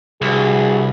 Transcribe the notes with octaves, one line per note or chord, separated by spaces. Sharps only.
C2 G2 F#4 G#4